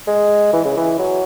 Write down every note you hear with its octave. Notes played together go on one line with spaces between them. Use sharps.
G#3
E3
C#3
E3
F#3